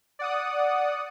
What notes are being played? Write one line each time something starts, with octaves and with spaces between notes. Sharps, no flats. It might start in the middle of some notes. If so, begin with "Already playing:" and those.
D5 F#5 D#6